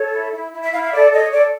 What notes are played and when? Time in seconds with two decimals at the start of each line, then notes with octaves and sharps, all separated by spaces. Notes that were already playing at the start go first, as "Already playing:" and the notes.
Already playing: A4 C#5
0.12 E4
0.31 E4
0.52 E4
0.62 E5
0.72 E4 F5
0.82 F5
0.93 A4 D5
1.13 C#5 D#5
1.32 A4 D5